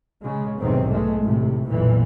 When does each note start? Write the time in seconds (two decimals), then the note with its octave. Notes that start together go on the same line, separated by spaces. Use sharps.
0.21 C#3 G#3
0.58 B1 E2 G#2 C3 D#3 C4
0.91 G#3 A3
1.22 G#1 A2 C3
1.66 F#1 B1 F2 A#2 E3 F3